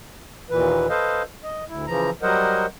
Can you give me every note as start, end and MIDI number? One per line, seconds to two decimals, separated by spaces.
0.50 0.87 39
0.50 0.87 46
0.50 0.87 52
0.50 0.87 71
0.89 1.23 69
0.89 1.23 71
0.89 1.23 72
0.89 1.23 75
0.89 1.23 77
1.44 1.64 75
1.69 1.86 38
1.69 1.86 64
1.87 2.10 49
1.87 2.10 52
1.87 2.10 53
1.87 2.10 82
2.22 2.66 54
2.22 2.66 55
2.22 2.66 70
2.22 2.66 72
2.22 2.66 75
2.22 2.66 78